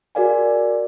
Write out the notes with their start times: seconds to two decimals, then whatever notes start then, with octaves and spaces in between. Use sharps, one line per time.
0.15 F#4 G#4 A#4 D5 F5 G#5